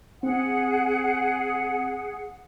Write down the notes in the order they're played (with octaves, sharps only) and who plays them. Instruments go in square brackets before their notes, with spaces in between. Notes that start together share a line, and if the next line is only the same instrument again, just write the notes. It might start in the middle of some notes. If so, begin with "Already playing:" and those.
[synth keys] C4 [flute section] G#4 F#5